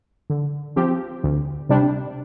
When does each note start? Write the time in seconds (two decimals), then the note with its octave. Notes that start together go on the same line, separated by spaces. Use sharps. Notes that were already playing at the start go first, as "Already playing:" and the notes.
0.30 D3
0.76 F3 C4 G4
1.23 D2
1.69 C3 G3 D4